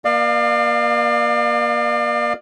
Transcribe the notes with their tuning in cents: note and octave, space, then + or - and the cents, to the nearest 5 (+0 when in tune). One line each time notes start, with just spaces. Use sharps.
A#3 +30 D5 +40 F5 +0